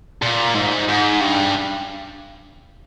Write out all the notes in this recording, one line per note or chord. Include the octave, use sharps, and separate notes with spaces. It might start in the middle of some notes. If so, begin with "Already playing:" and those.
A#2
G#2
G#2
G2